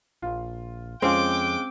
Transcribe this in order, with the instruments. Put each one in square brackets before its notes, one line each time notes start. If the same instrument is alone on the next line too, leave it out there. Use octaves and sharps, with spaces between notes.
[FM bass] A#1 [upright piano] F4
[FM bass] F2 [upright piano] G#3 C#4 F4 [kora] C4 [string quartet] G5 D6